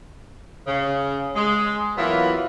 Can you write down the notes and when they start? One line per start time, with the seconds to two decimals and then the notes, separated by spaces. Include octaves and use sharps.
0.67 C#3
1.36 G#3
1.97 E3 F#3 A#3 B3 E4 F4